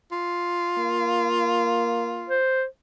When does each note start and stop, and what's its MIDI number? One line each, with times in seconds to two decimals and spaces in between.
0.12 2.39 65
0.78 2.27 58
2.30 2.65 72